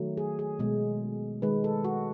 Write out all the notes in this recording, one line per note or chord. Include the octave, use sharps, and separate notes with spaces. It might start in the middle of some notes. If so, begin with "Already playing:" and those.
Already playing: D#3 F#3 A3
G#4
G#4
B2 G#3
D#3 G#3 B4
A4
F#4